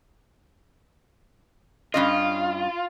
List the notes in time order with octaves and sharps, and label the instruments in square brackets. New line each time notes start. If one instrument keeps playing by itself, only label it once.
[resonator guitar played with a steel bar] G2 C#4 D#5 [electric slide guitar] F4